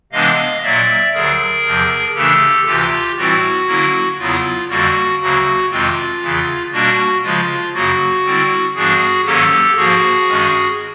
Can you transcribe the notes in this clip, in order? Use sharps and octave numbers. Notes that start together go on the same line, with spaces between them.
C3 E3 G#3 B3 D4 D#5 F5
A#2 F#3 A#3 D5 E5
D2 D3 F#3 G#4 A#4
E2 C3 F3
C#3 E3 A3 D4 G4 A4
D2 C3 E3 F4 G4
A2 E3 G3 C4 E4 F#4
D3 F#3 A#3 C#4 E4
E2 C#3 F#3 B3 E4 F4
F2 D3 G3 A#3 F#4
D2 C#3 F#3 A#3 F#4
F2 C3 D#3 G#3 C4 F4
E2 C#3 E3
B2 G3 A#3 D4 F#4
C#3 F3 G#3 F4
F#2 C#3 F#3 A#3 F#4
D3 G3 C4 E4
G2 E3 G3 B3 D4 F#4 G#4
G#2 D#3 F#3 A#3 C#4 G4 A4
G#2 F3 A#3 F#4 G#4
G2 D#3 G#3 C#4